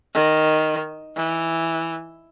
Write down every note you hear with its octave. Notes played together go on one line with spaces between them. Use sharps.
D#3
E3